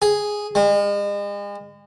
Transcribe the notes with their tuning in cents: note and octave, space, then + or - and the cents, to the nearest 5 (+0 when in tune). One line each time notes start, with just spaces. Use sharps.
G#4 +0
G#3 -40